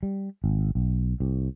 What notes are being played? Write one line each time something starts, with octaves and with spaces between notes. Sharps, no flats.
G3
G#1
B1
C2